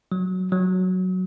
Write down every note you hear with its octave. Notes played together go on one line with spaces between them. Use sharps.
F#3
F#3